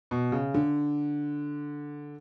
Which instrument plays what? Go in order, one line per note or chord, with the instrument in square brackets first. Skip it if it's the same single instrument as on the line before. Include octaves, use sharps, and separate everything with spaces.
[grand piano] B2
C#3
D3